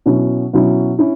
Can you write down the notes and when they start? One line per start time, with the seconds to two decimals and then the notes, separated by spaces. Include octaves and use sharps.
0.06 B2 F#3 C#4 E4
0.53 B2 F#3 C#4 E4
0.99 C#4 E4